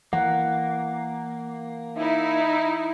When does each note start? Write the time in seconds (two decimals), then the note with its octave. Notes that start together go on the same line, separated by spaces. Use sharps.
0.13 E3 A#3 F#5
1.97 D#4 E4